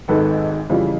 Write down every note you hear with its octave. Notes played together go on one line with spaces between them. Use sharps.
G#1 G#2 D#3 A4 B4
F2 C#3 E3 G3